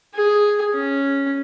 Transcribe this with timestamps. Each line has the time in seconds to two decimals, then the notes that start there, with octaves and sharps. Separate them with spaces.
0.14 G#4
0.74 C#4